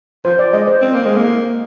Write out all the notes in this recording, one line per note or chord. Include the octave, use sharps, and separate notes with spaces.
F3 C5
D5
G#3 D#5
C5
C4
A#3
G#3
A#3